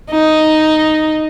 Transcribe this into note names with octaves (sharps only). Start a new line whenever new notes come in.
D#4